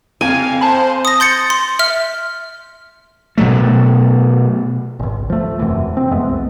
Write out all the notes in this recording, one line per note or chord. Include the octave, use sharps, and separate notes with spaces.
F2 F5 G#5
C5 A5 B5
D#6 A#6
C6 G6 A6 C#7
C6
E5 F6
B2 F#3 A3
G#1 C#2
F3 A3
E1 F#2 C3 E3
C4
F2 G#3 A3 B3
C2